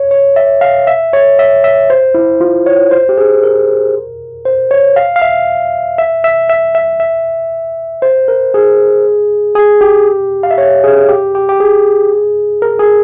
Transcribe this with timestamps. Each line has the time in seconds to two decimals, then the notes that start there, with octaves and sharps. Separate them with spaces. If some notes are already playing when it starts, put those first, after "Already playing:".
Already playing: C#5
0.11 C#5
0.36 E5
0.61 F5
0.87 E5
1.13 C#5
1.39 E5
1.64 E5
1.90 C5
2.14 E4
2.41 F4
2.66 C#5
2.91 C5
3.09 G4
3.18 G#4
3.43 A#4
4.45 C5
4.71 C#5
4.96 F5
5.16 F5
5.22 E5
5.98 E5
6.24 E5
6.49 E5
6.75 E5
7.00 E5
8.02 C5
8.28 A#4
8.54 G#4
9.55 G#4
9.81 G4
10.43 F5
10.51 E5
10.58 C#5
10.84 G#4
11.09 G4
11.35 G4
11.49 G4
11.60 G#4
12.62 A#4
12.79 G#4